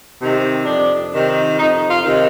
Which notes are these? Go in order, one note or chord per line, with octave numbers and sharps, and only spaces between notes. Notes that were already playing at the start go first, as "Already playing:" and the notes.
C3 D#3
F2 D4
C3 D#3
F2 D#4
F4
C3 D#3